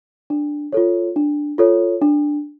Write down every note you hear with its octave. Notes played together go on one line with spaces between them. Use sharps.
D4
F4 A4 C#5
D4
F4 A4 C#5
D4